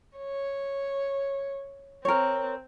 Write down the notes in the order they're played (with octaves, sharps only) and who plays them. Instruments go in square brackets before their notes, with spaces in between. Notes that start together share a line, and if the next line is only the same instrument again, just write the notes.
[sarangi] C#5
[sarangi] C4 [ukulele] A#4 C#5